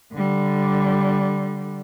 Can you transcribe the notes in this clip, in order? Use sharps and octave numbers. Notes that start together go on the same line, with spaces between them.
D3 G3